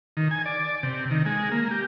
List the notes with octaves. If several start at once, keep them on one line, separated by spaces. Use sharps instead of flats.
D#3
G#5
D5
C3
D#3
G#3
A#3
G4